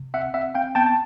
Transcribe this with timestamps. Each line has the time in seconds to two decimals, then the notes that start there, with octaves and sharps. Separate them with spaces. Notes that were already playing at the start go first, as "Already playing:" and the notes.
Already playing: C3
0.14 C4 E5 F#5
0.34 C4 E5 F#5
0.54 C4 F5 G5
0.75 B3 G5 A5
0.86 A5